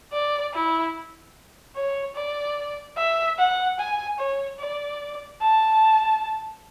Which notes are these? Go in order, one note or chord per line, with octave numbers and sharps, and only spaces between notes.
D5
E4
C#5
D5
E5
F#5
G#5
C#5
D5
A5